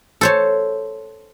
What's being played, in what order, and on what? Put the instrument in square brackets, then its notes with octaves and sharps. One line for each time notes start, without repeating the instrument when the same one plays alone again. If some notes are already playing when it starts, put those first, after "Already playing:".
[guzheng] A4 C5 C#5